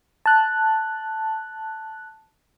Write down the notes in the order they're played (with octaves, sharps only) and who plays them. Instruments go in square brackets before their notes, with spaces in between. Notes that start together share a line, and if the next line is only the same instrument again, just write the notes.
[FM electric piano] A5 F#6